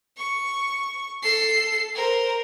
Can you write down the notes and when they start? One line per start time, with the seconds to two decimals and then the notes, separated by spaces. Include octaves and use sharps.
0.17 C#6
1.22 A4 C7
1.95 A#4 C5